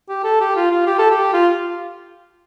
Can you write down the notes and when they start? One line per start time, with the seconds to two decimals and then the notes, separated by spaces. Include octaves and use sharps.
0.09 G4
0.24 A4
0.40 G4
0.56 F4
0.71 F4
0.87 G4
0.99 A4
1.11 G4
1.33 F4